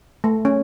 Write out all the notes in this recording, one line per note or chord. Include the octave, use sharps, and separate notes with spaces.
A3
C#4